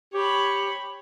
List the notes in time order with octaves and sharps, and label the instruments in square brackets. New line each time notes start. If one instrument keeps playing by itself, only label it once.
[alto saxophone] G4 [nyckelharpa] C#5 B5